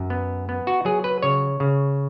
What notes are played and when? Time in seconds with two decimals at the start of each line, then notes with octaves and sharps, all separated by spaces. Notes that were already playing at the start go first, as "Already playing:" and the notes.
Already playing: F#2
0.10 B3
0.49 B3
0.67 F#4
0.85 F#3 G#4
1.04 B4
1.23 C#3 C#5
1.60 C#3